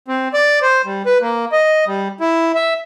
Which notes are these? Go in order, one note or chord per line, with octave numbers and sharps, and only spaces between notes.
C4
D5
C5
G3
B4
A#3
D#5
G3
E4
E5